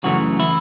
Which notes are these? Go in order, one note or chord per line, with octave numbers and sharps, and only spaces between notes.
F#2 C#3 E3 F#3 A3 F#4
E3 E4